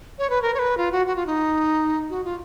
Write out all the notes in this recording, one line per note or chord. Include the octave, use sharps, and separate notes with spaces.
C#5
B4
A#4
C#5
B4
F4
F#4
F#4
F4
D#4
F#4
F4